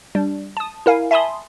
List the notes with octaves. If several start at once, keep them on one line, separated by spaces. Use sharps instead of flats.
G3 D4
A5 D#6
E4 A#4 F5 G#5
E5 G#5 A5 B5 C6 D#6